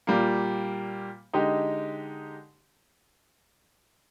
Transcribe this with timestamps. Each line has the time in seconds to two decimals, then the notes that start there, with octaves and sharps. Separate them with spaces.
0.07 A#2 G3 A#3
1.33 D3 G#3 D#4 G4